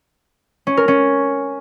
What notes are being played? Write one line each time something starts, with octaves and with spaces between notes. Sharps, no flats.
C#4
A#4
C#4